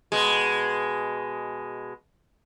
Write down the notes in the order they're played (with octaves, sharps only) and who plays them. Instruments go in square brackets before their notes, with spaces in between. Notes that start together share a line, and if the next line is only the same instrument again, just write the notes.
[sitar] B2 G#3